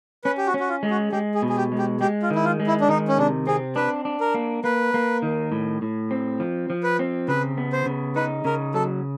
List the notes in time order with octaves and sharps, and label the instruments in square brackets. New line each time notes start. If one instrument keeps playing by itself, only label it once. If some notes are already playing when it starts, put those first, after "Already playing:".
[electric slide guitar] C#4 [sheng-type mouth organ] B4
[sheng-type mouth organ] G4
F#4
[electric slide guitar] C#4
[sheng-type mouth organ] F#4
F4
[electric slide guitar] G#3
[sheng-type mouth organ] F#4
[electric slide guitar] G#3 [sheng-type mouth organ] G4
[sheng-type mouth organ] G#4
[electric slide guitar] B2
[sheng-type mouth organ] G#4
G4
[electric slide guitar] G#3
[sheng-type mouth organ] G4
[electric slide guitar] G#3 [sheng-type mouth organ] G4
[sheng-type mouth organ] F4
[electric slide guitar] D#3 [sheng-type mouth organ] E4
[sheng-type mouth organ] F4
[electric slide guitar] G#3
[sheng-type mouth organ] E4
D4
[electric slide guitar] D#3 [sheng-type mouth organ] D#4
[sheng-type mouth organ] C#4
[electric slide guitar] C3 [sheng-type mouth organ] D4
[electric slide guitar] C4 [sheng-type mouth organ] G#4
[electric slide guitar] D4 [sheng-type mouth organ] B4
[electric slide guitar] D4
[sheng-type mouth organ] A#4
[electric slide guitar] A#3
[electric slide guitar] A#3 [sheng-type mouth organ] B4
[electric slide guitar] A#3
D#3
A2
A2
C4
F3
F3
[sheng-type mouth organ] B4
[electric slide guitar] C4
[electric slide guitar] C#3 [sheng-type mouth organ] B4
[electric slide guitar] B3
[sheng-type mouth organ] C5
[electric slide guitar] C#3
[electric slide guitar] D#4 [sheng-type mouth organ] B4
[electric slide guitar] C#3 [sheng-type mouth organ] A#4
[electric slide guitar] F#3 [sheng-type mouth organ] A4